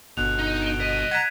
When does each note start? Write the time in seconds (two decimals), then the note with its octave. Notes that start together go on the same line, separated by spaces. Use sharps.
0.17 G1 B2 F#6 F7
0.39 D#4
0.62 D7 E7 G7
0.80 C2 D#5 B6 D#7
1.11 F#5 A#5 G#6 B6 E7